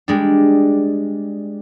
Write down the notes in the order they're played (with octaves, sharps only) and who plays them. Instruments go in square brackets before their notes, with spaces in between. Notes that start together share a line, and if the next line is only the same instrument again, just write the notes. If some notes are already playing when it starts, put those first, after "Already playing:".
[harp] G3 G#3 D4